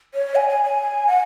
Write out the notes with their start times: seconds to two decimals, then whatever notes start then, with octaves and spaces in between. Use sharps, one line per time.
0.14 C#5
0.35 G#5
0.49 G#5
0.64 G#5
1.07 F#5